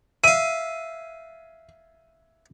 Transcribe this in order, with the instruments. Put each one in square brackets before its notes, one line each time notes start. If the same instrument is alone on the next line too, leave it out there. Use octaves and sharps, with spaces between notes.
[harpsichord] E5 F5 [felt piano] D#7